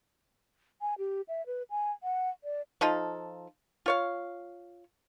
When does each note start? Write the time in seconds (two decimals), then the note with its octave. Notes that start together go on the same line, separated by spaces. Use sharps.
0.81 G#5
0.98 G4
1.28 E5
1.46 B4
1.70 G#5
2.03 F#5
2.44 D5
2.81 F3 D#4 F4 A4
3.86 F4 C#5 F5